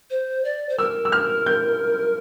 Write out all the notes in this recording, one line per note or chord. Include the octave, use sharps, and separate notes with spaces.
C5
D5
C5
A#4 E6
E6
F6
G6